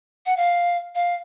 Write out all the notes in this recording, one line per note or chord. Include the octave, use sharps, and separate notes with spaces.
F#5
F5
F5